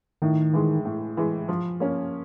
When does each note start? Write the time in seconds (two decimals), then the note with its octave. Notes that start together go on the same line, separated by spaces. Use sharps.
0.22 A2 D#3
0.53 E3 G#3
0.85 A2
1.17 E3 G#3
1.49 F3
1.80 A#3 C#4